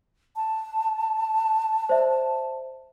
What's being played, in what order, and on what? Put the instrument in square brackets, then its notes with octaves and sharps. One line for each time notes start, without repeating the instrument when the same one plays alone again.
[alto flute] A5
[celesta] C5 D5 E5